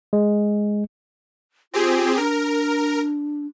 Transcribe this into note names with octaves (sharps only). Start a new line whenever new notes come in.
G#3
C4 F4 G4 G#4
D4 A#4